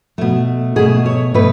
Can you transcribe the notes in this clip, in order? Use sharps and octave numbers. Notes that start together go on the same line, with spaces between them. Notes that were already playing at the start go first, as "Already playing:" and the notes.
B2 A3
B2 A3 G#4
C#5
B2 A3 B4